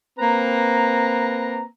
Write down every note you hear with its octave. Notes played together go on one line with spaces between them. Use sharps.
A#3 C4 B4 A#5